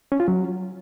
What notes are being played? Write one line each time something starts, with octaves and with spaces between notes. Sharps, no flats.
C#4
F4
F#3